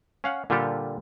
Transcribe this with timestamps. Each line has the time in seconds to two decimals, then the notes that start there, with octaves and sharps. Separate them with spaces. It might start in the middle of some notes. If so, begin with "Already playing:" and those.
0.24 C#4 F5 F#5
0.50 A#2 D3 G3 F4 G4 A4